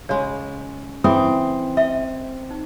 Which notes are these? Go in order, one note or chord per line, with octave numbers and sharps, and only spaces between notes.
C#3 G#3 C#5
E3 C4 E4 G#4 D#6
D#5 E5
D#4